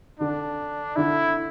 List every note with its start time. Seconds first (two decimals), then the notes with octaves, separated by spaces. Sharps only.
0.20 D3 D4
0.96 D3 E4